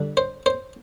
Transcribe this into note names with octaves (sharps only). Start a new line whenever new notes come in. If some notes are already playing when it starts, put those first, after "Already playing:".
Already playing: D3 G3 D4
C5
C5